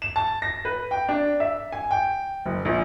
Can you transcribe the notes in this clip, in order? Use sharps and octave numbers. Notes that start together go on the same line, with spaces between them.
E7
A5
A#6
B4
G5
D4
E5
G#5
G5
F#1
A#1